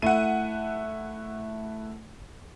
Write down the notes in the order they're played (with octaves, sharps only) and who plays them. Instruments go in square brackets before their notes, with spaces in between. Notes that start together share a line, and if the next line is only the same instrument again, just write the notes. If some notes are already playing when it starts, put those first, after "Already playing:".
[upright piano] A3 E4 [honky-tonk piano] F#5 D#7